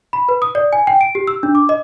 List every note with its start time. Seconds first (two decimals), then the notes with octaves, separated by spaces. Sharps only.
0.13 B5
0.29 B4
0.42 D#6
0.55 D5
0.73 G#5
0.87 G5
1.01 D7
1.15 G4
1.27 E6
1.43 D4
1.55 D6
1.69 D#5